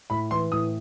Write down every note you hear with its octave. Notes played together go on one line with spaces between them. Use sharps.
A2 B5
E3 C6
A2 D#6